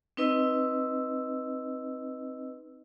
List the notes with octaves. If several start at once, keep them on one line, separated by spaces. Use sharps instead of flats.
C4 D#4 B4 D#5 E6